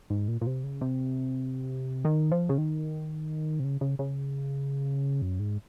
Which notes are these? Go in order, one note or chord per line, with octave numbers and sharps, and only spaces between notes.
G#2
A#2
A#2
C3
C#3
C3
D#3
F3
C#3
D#3
C3
C#3
C#3
C#3
F#2
G#2